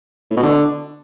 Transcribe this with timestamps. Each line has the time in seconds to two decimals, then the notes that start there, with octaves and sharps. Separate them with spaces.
0.30 A2
0.37 B2
0.43 D3